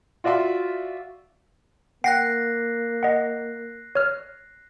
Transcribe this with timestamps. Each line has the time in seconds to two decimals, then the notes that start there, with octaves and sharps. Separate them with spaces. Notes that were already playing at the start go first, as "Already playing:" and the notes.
0.24 F4 F#4 D5 E5 C6
2.04 A#3 F#5 G5 F#6 A#6 C7
3.03 D#5 F#5
3.95 C#5 F6